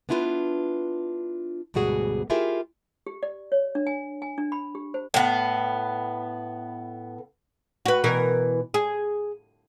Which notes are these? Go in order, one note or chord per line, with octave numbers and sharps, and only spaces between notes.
B3 D4 E4 F4 G4 B4
D2 G#2 B2 G3 F#4 G#4
E4 F4 G4 G#4 A#4 E5
G4
D5
C#5
D4
G#5
G#5
D4
B5
G4
C5
A2 B3
F#4 B4
B2 E3 A#4
G#4